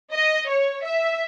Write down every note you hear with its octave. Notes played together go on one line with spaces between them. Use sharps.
D#5
C#5
E5